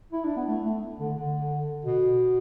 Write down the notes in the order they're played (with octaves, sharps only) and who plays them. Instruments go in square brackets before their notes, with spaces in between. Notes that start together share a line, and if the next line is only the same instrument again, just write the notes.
[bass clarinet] E4
D4
B3
A3
A3
D3
D3
B2